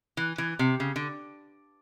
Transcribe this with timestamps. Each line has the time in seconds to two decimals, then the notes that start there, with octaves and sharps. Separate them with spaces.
0.17 E3
0.38 E3
0.59 C3
0.80 C#3
0.96 D3